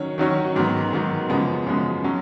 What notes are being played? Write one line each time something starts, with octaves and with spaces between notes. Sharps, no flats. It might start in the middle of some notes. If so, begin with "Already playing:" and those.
Already playing: D#3 F#3 C#4 C#5
D#3 F#3 C#4 F#4 C#5
G#2 D#3 F#3 B3
G#2 D#3 F#3 B3
F#2 C#3 F3 G#3 B3
F#2 C#3 F3 G#3 B3
F#3 C#4